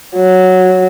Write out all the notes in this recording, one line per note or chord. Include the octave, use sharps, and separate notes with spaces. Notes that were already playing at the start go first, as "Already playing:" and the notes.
F#3